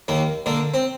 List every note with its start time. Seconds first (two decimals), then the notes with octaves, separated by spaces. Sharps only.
0.08 D#2 A#3
0.46 D3 A#3
0.74 C4